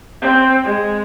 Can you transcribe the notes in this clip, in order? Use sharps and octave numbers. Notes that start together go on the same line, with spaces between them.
C4
G#3